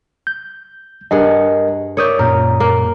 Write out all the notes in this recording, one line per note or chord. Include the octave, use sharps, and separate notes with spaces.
G6
G2 G#4 A#4 D#5 F#5
A#4 C#5 D5 E5 D#6 G6
F#2 A#2 A#4
A#3